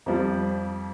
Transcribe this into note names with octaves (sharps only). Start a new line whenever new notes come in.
F2 F3 G3